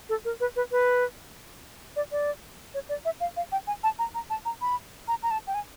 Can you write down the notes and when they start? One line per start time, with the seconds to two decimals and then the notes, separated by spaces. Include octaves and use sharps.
0.09 A4
0.25 A#4
0.40 B4
0.56 B4
0.72 B4
1.96 D5
2.12 D5
2.74 C#5
2.89 D5
3.05 E5
3.20 F5
3.37 F5
3.52 G5
3.67 G#5
3.84 A5
3.99 A#5
4.15 A#5
4.30 A5
4.45 A#5
4.61 B5
5.08 A#5
5.23 A#5
5.31 A5
5.47 G5
5.54 G#5